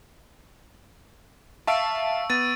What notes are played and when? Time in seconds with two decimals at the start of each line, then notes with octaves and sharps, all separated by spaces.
1.67 E5 F5 A5 C#6 E6 D7
2.30 B3 A6 D#7